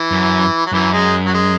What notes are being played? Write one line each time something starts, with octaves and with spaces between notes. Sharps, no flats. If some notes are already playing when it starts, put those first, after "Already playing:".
Already playing: E3
F#2
F#3
F#2 E3
G#3
F#3
G#3